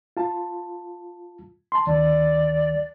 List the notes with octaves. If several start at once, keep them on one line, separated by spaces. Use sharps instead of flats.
F4 A5
A5 C6
D2 D#3 D5